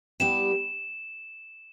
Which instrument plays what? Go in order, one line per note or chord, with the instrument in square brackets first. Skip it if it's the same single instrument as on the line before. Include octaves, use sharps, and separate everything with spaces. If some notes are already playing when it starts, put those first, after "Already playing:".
[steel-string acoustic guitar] G3 B3 E4 G4 B4 [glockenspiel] E7